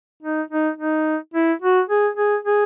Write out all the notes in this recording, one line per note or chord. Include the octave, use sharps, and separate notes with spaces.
D#4
D#4
D#4
E4
F#4
G#4
G#4
G#4